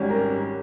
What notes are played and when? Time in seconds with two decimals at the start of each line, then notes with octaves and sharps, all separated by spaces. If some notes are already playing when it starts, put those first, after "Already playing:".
Already playing: G#1 G#2 G3 C#4
0.09 A#4